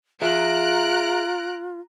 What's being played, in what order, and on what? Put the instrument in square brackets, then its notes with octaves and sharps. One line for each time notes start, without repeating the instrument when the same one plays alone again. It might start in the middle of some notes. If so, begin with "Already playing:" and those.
[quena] F4 [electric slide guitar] G#4 E5 [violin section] A#5 F#6 D7